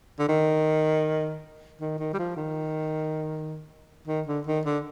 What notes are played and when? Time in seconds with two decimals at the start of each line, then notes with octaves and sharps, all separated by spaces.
0.19 D3
0.29 D#3
1.81 D#3
1.99 D#3
2.13 G3
2.19 F3
2.37 D#3
4.08 D#3
4.27 D3
4.47 D#3
4.65 D3